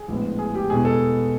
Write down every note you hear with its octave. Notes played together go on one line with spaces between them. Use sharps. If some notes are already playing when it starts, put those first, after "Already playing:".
Already playing: G#4
A#1 A2 E3 G#3 B3
G#4
G4
E2 B2 G#3 G#4
A4